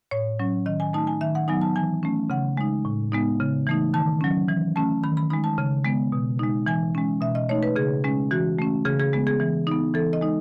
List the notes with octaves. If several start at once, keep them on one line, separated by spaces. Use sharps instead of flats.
A2 C#5
F#3 C#4
D#3 D#5
G#5
A3 D#4 A5
G#5
D#3 E5
F#5
F#3 B3 D#4 G#5
A5
E3 G#5
A3 C#4
C#3 F#5
G#3 D#4
A2
G#3 B3 D#4
C#3
E3 A3 D#4
D#3 A5
F#3 C#4
E3
A3 C#4 A5
D#3 B5
B5
G#3 D#4 B5
A5
C#3
G#3 B3
B2
G#3 D#4
E3 G#5
G#3 C#4
B2 E5
D#5
A3 D#4 C#5
B4
C#3 G#4
G#3 C#4
E3 F#4
A3 C#4
C#3 G#4
G#4
G#3 B3
G#4
E3
B3 D#4
E3 A4
D#5
G#3 D#4